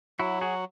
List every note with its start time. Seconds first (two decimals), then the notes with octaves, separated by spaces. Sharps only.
0.19 F#3 E4 F#4
0.41 F#4 G#4